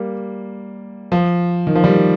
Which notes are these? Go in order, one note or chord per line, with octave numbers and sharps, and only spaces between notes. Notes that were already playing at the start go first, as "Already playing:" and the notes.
Already playing: G3 A#3
F3
D#3
F3
D#3 G3